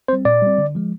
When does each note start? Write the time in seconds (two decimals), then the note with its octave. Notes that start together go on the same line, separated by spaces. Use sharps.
0.08 G3 C4 C5
0.25 A#2 D5
0.42 G3 C4
0.58 D3
0.75 F3 G#3